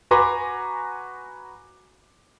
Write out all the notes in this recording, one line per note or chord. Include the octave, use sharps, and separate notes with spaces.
F#4 B4 G#5 A#5 C6 D6